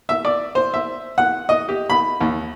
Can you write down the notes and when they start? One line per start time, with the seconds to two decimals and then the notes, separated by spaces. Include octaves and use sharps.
0.09 E5
0.25 D5
0.55 C5
0.74 E5
1.18 F#5
1.49 D#5
1.69 G4
1.90 B5
2.21 D#2